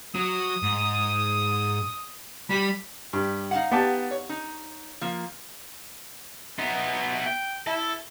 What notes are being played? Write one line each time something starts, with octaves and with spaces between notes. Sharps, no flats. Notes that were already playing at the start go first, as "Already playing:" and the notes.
F#3 D#6
G#2
G3 B5
G2 G4
D#4 F5 F#5
B3 G4 A5
C#5
D#4
F3 A#3
B3 D#4 E5
G5
E4 A4